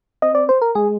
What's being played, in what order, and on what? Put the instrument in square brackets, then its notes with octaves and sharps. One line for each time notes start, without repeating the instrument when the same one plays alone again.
[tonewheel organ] C4 [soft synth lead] D#5
[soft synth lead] D5
C5
A#4
[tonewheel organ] G#3 [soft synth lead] G#4